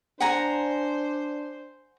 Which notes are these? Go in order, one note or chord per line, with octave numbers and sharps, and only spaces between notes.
D4 C5 F#5 G#5 A#5